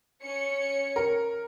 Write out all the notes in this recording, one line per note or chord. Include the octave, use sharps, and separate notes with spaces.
C#4 C#7
A#4